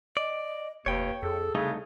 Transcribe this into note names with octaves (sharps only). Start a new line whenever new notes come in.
D5 D#5
F1 D#2 B4 C#5 G5
F2 G#4 A4
C2 C#3 A3 D#4 A4